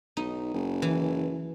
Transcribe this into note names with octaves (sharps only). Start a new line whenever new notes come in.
B1 D#4
F#1
E3